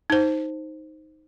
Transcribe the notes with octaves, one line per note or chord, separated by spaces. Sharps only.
D#4 C5